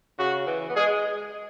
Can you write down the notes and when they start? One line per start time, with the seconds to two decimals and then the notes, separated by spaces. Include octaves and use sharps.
0.19 C#3 F#4
0.47 E3
0.70 B3
0.76 G#3 G#4